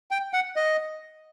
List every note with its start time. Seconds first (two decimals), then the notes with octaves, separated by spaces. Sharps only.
0.11 G5
0.33 F#5
0.56 D#5